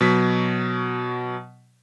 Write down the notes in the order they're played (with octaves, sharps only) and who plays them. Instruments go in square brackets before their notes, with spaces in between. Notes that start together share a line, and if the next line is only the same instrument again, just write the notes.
[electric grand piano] B2 F#3 B6